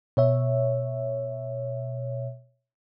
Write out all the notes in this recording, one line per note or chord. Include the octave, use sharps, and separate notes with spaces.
B2 C#5 E5